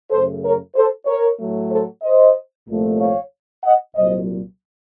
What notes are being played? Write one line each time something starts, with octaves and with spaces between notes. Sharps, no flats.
F#2 C#3 A3 A4 C5
A#4 C#5
A4 C5
A#4 C#5
A2 F#3 A3
A4 C5
C5 D#5
C2 A#2 F3 A3
C#5 F5
D#5 F#5
C2 A#2 F#3 C5 D#5